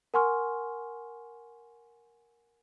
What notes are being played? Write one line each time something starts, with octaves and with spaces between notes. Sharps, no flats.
A#4 F#5 G#5 C6 C#6 F6